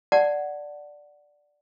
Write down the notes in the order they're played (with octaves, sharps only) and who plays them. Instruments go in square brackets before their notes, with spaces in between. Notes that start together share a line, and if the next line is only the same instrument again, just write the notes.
[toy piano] D5 F#5 A5